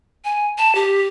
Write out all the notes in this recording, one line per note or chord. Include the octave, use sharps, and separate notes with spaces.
G#5
A5
G4